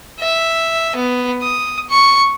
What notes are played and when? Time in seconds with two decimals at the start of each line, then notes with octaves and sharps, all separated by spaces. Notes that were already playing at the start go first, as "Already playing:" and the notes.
0.20 E5
0.96 B3
1.42 D#6
1.90 C#6